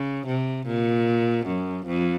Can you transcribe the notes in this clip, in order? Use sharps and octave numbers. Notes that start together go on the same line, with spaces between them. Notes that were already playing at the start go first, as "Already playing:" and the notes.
Already playing: C#3
C3
A#2
F#2
F2